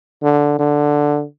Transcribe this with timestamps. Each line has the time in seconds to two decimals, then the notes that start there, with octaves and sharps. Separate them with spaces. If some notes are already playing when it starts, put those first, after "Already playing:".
0.23 D3
0.59 D3